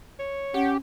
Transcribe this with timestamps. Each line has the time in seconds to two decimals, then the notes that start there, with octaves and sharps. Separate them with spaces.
0.19 C#5
0.54 C#4 G4 F#5